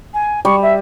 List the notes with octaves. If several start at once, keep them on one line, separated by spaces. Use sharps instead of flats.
G#5
G3 C#6
E5